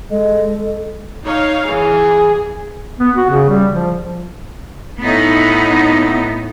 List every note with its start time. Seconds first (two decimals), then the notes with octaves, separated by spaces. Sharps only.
0.11 G#3 A4 D#5
1.23 D#4 C#5 F5
1.68 E3 G#4
3.00 B3
3.16 F#4
3.30 C#3
3.49 G3
3.72 F3
5.00 A2 B3 D#4